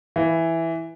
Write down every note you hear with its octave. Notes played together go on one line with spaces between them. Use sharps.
E3